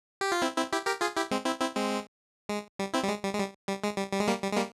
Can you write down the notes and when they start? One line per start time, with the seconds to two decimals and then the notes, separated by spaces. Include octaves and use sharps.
0.21 G4
0.32 F4
0.42 C4 E4
0.57 C4 E4
0.72 E4 G4
0.86 G4 A#4
1.01 F4 G#4
1.16 E4 G4
1.31 G#3 C4
1.46 C4 E4
1.60 C4 E4
1.76 G#3 C4
2.49 G#3
2.79 G3
2.93 C4 E4
3.04 G3
3.08 G#3
3.24 G3
3.33 G#3
3.39 G3
3.68 G3
3.84 G#3
3.98 G3
4.12 G3
4.20 G#3
4.27 G3 A#3
4.43 G3
4.52 G#3
4.56 G3 A#3